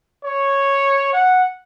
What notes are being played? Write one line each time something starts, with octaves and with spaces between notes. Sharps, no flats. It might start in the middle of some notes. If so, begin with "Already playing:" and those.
C#5
F#5